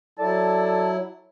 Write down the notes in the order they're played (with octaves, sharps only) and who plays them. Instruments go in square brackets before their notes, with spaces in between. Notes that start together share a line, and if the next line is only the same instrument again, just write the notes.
[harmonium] F#3 E4 [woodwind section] A4 D5 A5